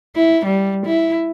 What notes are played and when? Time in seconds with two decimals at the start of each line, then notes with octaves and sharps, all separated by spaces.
0.15 E4
0.46 G3
0.86 E4